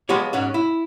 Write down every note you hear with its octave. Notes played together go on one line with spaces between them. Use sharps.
F3 G#3 B3 F#4 G4 C#5
G#2 C#4 F#4
E4